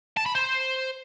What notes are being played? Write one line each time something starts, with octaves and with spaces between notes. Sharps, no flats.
A5
B5
C5